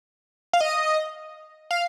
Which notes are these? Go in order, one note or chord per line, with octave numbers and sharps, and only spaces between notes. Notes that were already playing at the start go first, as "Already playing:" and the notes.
F5
D#5
F5